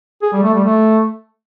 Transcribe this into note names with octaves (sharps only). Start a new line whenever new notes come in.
G#4
G3
A3
G3
A3